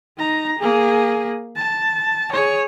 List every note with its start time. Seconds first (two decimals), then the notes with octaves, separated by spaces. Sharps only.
0.18 D#4 A#5
0.59 A#3 G#4
1.56 A5
2.32 G#4 C#5